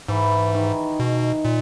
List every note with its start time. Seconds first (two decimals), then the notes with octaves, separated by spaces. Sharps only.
0.08 G#2 E3
0.55 D#3
1.00 B2 D#3
1.45 A#2